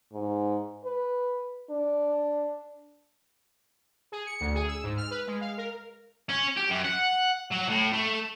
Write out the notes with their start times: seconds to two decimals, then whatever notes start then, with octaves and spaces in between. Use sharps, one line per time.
0.12 G#2
0.84 B4
1.70 D4
4.12 G#4
4.27 C#7
4.40 D2
4.55 G#4
4.68 E6
4.83 G#2
4.97 F6
5.11 B4
5.27 G#3
5.41 F5
5.58 A#4
6.30 C#4
6.57 G4
6.70 F#2
6.85 F#5
7.51 F#3
7.69 A2
7.93 A3